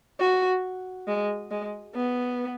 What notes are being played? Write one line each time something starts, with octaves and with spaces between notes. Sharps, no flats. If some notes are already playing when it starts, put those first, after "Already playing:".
F#4
G#3
G#3
B3